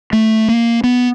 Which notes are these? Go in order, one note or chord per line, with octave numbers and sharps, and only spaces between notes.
A3
A#3
B3